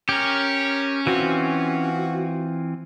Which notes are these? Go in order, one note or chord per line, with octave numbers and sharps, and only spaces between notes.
C#4 G4 A#4
E3 C4 F4 F#4